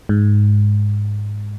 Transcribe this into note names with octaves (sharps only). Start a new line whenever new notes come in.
G#2